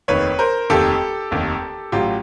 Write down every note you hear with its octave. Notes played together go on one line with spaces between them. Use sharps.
F1 D#2 D#3 B4 C#5
A#4 C5
F1 D#2 D#3 G4 A4
F1 D#2 D#3
A1 A2 F#3 F4 G4